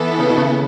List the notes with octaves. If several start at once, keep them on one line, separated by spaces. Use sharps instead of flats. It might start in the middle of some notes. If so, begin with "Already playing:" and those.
Already playing: E3 B3 E4 A4
C#3
B2
C#3